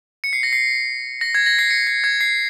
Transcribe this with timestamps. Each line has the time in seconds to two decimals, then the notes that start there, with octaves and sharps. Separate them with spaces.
0.24 C#7
0.33 C7
0.43 A#6
0.53 C7
1.21 A#6
1.35 G#6
1.46 A#6
1.59 C7
1.70 C#7
1.87 C7
2.04 G#6
2.21 C7